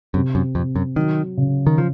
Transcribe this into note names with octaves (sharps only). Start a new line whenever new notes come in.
F#2 C3
F#2
F2 C3
F#2
D#3 F#3
C#3
D#3
F3